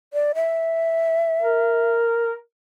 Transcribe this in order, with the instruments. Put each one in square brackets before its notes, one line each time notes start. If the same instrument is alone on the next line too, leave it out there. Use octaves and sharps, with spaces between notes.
[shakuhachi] D5
E5
[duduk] A#4